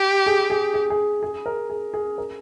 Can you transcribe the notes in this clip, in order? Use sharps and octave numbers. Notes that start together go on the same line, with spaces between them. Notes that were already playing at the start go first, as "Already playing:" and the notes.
Already playing: G4
G#4
G#4
G#4
G#4
G#4
A#4
G#4
G#4
A#4